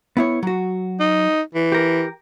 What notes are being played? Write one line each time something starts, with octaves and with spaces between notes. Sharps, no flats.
B3 E4 C#5
F#3 F#4
D#4
E3
G4 A#4